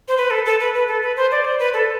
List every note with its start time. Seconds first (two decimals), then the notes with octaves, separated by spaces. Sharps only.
0.08 C5
0.17 B4
0.31 A4
0.45 A4
0.60 B4
0.74 B4
0.88 A4
1.03 B4
1.17 C5
1.32 D5
1.45 C5
1.59 B4
1.74 A4